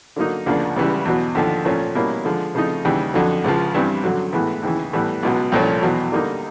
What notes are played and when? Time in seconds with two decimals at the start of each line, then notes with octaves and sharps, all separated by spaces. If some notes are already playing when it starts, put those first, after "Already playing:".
0.16 D3 F#3 A#3 D#4
0.46 D2 C#3 F3 A#3 D4
0.76 C#2 C#3 E3 G3
1.05 E2 B2 F#3
1.35 D#2 D3 F3
1.65 A#2 F3 A3 C#4
1.95 B2 G3 A#3 C#4 E4
2.25 D3 F3 G#3
2.55 C#3 F3 A3 C4 D#4
2.85 D#2 C#3 E3 G3
3.14 F2 D3 F#3
3.44 C#2 C#3 F3
3.74 G2 E3 G3 C4
4.04 F#2 D3 F#3
4.33 A2 E3 G#3 B3
4.63 D#2 C#3 E3
4.93 A2 E3 G3 B3
5.23 C#2 B2 F#3
5.52 C2 A#2 F3 A3 C#4
5.82 E2 B2 F#3
6.12 D3 G3 A#3 D#4